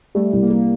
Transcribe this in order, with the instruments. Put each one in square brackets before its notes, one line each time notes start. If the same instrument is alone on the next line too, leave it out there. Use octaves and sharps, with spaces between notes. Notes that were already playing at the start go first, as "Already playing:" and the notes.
[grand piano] G3 [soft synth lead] A3
[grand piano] C2
[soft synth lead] A#3
[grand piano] G3